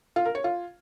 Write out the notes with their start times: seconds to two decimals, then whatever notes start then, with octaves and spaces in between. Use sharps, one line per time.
0.16 F4
0.25 A#4
0.35 C#5
0.44 F4